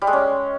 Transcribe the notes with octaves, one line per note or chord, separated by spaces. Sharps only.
G3
G#3
C#4